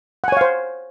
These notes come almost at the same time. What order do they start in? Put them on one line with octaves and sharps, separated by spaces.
F#5 G#5 C#5 F5 C5